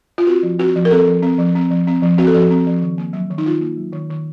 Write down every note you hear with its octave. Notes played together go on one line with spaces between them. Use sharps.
F4
C4 F#4
F3
C4 F#4
F3
A#4
C4 A4
F3
C4
F3
C4
F3
C4
F3
C4 F#4
A4
F3 F#4
C4
F3
D#3
A#3
F#3
D#3
D#4
D#3 F4
A#3
F#3
D#3
D#3